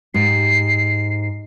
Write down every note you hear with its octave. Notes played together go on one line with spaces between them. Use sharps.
G#2 G4 C7